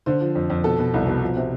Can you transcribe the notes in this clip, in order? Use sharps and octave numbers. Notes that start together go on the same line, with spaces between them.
D3 C5
F3
F2
F2
B2 A4
B2
C2
B2
F3
C3